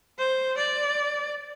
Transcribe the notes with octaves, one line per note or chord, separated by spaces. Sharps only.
C5
D5